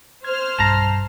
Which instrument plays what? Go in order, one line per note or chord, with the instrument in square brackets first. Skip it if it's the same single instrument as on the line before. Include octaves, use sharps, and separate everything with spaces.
[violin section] C5 F6 [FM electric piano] G#6
[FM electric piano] B1 G2 C7 [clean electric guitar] A5 A#5